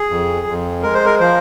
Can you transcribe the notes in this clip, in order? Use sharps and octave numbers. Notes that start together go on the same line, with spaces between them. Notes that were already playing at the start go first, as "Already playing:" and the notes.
Already playing: G#4
F2
F2
G#3 A#4
C5
A#4
F3 C5